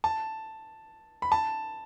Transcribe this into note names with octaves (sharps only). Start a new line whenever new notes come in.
A5
B5
A5